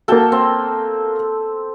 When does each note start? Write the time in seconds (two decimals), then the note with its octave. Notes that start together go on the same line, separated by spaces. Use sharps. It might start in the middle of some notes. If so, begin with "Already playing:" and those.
0.08 A#3 F#4 A4 G5 A5
0.32 C4